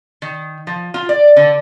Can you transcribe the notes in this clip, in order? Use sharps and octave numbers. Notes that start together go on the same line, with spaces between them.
D#3
F3
F4
D5
D3